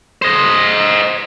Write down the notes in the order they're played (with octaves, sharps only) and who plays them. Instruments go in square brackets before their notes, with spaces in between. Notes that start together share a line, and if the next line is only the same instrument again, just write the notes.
[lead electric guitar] C5 D#5